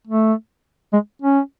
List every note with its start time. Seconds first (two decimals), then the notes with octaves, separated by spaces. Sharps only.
0.07 A3
0.93 G#3
1.22 C#4